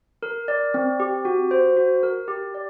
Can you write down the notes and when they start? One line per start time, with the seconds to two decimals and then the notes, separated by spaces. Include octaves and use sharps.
0.23 A#4
0.48 D5
0.74 C4
1.00 G4
1.25 F#4
1.51 C5
1.77 F#4
2.03 A#4
2.28 G4
2.54 D5